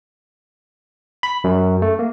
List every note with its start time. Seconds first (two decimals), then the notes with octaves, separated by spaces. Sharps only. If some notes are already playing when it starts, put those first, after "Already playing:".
1.23 B5
1.44 F#2
1.82 A3
1.99 A#3